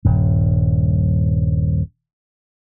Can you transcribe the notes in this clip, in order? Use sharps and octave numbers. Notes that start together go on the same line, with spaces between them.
D#1 G2